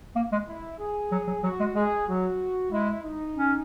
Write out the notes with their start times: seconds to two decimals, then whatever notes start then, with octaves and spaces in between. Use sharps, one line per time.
0.16 A#3
0.32 G#3
0.48 E4
0.79 G#4
1.12 F#3
1.27 F#3
1.43 F#3 F#4
1.60 G#3
1.75 G#3 G#4
2.07 F#3 F#4
2.71 G#3 E4
3.03 D#4
3.35 C#4